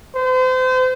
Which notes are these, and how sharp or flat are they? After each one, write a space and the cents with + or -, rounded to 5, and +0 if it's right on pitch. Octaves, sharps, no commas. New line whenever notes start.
C5 -35